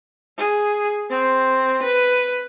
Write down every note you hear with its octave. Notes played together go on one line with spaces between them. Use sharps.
G#4
C4
B4